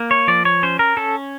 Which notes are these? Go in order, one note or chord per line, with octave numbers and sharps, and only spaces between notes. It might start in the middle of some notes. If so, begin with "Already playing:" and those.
Already playing: A#3
C#5
F3 D5
C#5
C#4 C5
A#4
C#4 A4